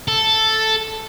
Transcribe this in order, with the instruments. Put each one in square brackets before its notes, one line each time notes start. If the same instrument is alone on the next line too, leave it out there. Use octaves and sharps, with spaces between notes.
[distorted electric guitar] A4